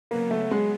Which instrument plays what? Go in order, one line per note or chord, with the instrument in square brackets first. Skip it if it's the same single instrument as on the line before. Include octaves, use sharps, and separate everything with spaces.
[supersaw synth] C#3 F#3 B3 [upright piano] A#3
[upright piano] A3
G#3